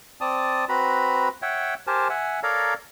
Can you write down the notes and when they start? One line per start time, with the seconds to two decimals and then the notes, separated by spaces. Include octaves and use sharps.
0.21 C4 D5 A5 D#6
0.69 C4 F#4 B4 A#5 B5
1.42 C#5 E5 F#5 G5
1.87 G4 A#4 C5 G#5 A5
2.09 E5 F#5 G#5
2.43 A4 A#4 C#5 D5 F5 A#5